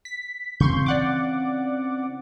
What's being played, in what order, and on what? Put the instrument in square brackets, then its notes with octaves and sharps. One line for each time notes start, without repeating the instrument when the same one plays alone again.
[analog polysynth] B6
[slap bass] C#3 E3 C4 [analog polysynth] C6 C#6 G6
[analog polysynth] D5 F#5 D6